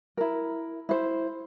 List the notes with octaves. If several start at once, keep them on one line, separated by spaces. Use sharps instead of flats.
E4 A#4
E4 C5